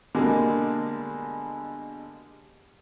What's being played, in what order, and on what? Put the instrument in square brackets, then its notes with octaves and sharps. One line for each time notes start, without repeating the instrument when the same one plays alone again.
[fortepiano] B2 D3 G3 G#3 A#3